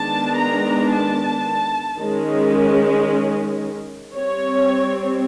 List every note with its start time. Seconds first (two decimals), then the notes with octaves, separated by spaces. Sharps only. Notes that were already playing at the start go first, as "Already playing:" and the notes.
Already playing: D#3 G#3 B3 D4 A5
0.38 A#5
0.92 A5
1.99 D#3 G#3 C#4
4.14 G3 C4 C#5